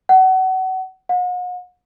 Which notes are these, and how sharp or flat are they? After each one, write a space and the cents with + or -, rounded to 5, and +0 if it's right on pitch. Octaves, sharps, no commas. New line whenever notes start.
F#5 +30
F#5 -40